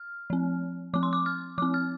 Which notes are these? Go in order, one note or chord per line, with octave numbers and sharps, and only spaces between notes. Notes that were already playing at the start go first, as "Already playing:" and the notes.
Already playing: F6
F3 C4
F3 C4 D6
C6
D6
F6
F3 C4 D6
F6